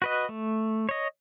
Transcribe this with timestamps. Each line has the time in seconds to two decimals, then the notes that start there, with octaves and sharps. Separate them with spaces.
0.02 F#4 B4 D#5
0.29 A3
0.89 C#5 D#5